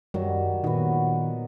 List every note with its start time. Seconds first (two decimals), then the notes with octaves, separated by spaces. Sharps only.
0.14 F#2 D#3 F#3 G3
0.64 A#2 D#3 B3 F#4